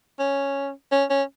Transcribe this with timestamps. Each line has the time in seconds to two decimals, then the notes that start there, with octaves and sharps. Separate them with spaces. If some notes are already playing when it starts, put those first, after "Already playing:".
0.19 C#4
0.92 C#4
1.10 C#4